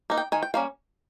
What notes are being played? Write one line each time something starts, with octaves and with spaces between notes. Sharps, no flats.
A#3 D#4
G5
D#3 G#5
G5
G3 A#3 C#4 F5